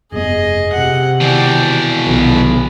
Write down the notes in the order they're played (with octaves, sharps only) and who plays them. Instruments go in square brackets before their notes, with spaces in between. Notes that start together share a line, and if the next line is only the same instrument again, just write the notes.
[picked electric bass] F1 G2 B3 [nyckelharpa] G#4 D#5
[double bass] C3 [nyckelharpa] F#5
[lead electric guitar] B2 E3 [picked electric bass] D#3 [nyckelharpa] D5 G5
[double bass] B1 [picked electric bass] C3 D#3 [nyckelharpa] B3